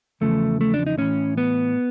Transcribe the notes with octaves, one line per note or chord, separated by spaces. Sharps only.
E2 C#3 F3 A3
A3
D4
D#4
A2 E3 C#4
B3